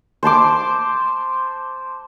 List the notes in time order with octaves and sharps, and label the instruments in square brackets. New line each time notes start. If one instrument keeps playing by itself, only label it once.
[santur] C5 A5 C6 D6